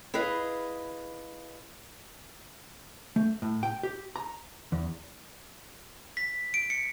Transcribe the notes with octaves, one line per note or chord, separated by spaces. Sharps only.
E4 G#4 B4 D#5 F5
A3
A2
G5
G4
A#5
E2
B6
D7
C#7